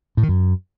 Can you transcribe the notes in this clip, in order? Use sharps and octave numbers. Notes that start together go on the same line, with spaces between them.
A2
D#3
F#2